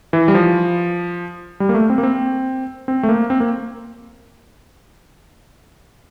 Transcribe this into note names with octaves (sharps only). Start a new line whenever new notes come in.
E3
G3
F3
G3
A#3
A3
C4
A#3
C4
C4
A3
A#3
C4
A#3